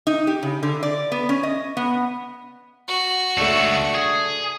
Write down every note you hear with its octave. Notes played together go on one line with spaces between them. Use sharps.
D#4
G4
C#3
D3
D5
B3
C#4
D#5
B3
F#4
C#2 A3 D4 A4
G#4